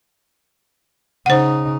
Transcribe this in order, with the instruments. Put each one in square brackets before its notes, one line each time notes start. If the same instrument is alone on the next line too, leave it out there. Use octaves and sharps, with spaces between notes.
[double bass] C#3 D#4 [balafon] C5 F#5